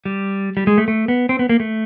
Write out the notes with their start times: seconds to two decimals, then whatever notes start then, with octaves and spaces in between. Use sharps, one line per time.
0.05 G3
0.57 G3
0.67 G#3
0.78 A3
0.88 A3
1.08 B3
1.29 C4
1.39 B3
1.49 A#3
1.60 A3